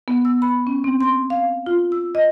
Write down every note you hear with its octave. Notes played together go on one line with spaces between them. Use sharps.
B3
E6
B5
C#4
C4
C6
F5
F4
E6
D#5